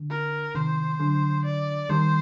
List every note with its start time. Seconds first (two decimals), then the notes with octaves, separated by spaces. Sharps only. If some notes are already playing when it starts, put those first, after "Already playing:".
Already playing: D3
0.10 A#4
0.55 C3 D#3 C5
1.00 D3 F#3
1.45 D5
1.89 D#3 G3 C5